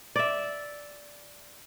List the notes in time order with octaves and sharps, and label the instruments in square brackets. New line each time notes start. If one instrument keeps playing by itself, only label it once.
[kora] D5 E5